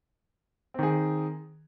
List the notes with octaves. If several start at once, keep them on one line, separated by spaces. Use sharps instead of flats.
D#3 C4 G#4